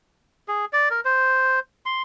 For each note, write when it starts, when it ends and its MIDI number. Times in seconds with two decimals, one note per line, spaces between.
0.48 0.65 68
0.73 0.89 74
0.90 1.00 70
1.05 1.59 72
1.86 2.02 84